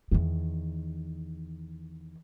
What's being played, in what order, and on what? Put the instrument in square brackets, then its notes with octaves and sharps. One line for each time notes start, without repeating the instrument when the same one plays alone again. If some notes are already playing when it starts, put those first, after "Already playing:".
[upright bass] E2 D#3